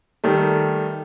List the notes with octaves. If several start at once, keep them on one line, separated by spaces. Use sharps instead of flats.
D#3 G3 A3